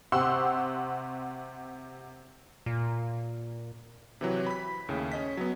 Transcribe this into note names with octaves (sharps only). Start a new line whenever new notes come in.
C3 G4 F#5 C6 C#6 E6
A#2
C3 E3 F#3
B5 B6
D#2 A2 C#3
C#4 D#5 B6
F#3 B3